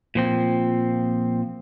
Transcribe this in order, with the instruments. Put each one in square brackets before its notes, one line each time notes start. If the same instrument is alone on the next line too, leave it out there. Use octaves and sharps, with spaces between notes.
[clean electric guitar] A#2 F3 C4